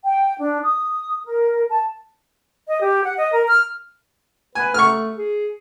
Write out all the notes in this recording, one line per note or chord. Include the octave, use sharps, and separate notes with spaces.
G5
D4
D#6
A#4
A5
D#5
G4
F#5
D#5
A#4
F6
B4 G#5
A3 C#6 F6
G#4